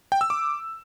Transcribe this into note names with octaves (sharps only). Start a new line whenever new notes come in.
G5
E6
D6